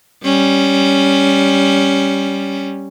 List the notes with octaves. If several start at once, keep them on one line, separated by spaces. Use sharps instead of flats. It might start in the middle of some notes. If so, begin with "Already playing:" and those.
G3 C#4